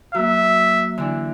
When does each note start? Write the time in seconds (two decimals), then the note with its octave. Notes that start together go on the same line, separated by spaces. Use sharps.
0.15 F#3 A#3 E5
0.98 D3 E3 D4